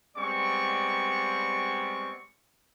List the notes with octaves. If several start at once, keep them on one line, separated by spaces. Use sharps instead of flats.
G3 G#3 B3 C4 D5 C#6